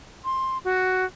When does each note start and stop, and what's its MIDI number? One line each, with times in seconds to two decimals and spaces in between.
0.25 0.58 84
0.65 1.05 66